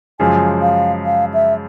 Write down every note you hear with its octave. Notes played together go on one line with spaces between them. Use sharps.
F#2 C#3 F3 G#3 G#5
F5
F5
E5